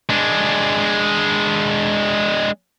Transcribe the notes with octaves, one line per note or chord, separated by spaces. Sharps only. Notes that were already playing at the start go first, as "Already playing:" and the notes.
G#3 D4